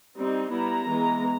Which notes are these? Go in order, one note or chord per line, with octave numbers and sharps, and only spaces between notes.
G3 C4 D#4
G3 B3 E4 A#5
E3 G#3 B3